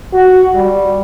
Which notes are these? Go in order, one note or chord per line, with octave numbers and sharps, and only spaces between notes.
F#4
G3